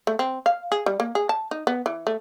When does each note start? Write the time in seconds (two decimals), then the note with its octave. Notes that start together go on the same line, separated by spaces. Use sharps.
0.07 A3
0.19 C4
0.46 F5
0.72 G#4
0.86 G3
1.00 A#3
1.15 G#4
1.29 A5
1.51 D#4
1.67 B3
1.86 E3
2.07 A3